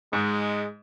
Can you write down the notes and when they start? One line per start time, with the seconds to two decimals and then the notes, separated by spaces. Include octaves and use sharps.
0.13 G#2 G#3